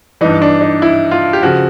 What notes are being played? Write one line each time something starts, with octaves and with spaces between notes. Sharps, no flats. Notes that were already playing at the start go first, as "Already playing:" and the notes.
G2 E3 D#4
D4
D#4
E4
F4
G4
C#3 F3 F#4